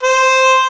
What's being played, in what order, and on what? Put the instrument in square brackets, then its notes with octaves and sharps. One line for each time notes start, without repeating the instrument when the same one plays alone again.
[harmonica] C5